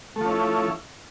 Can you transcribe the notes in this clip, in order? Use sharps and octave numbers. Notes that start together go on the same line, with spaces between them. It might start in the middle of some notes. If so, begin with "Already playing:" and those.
F3 A3 C#4 E4